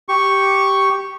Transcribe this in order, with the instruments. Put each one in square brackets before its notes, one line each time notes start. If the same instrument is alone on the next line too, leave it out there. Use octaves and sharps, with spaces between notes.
[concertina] G4 C#6